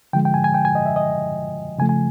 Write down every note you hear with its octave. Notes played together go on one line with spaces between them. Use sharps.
D3 F3 G#3 G5
G5
G#5
G#5
G5
G#5
D#5
E5
D#5
C#3 F3 A3 G#5
G#5